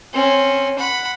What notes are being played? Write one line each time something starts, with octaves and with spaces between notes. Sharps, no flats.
C4 C#4
F#5 B5